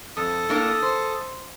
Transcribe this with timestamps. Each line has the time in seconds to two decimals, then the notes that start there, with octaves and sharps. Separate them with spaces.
0.17 F2 A4 D#6
0.49 A2 A#3 D4
0.82 C5